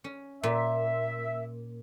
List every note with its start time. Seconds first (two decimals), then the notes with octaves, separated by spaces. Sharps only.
0.04 C#4
0.43 A#2 E5